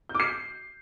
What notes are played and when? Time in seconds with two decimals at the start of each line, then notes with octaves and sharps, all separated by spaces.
0.09 G6
0.15 D6
0.20 C7